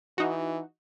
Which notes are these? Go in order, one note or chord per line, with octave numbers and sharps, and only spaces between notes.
E3 D#4 F#4